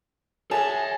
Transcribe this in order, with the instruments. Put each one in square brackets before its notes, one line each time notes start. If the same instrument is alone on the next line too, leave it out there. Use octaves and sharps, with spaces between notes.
[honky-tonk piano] G#4 A5 E7 [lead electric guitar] C#5 E5